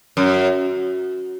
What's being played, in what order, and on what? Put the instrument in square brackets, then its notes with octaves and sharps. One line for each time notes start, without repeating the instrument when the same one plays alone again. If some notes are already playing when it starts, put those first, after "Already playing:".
[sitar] F#2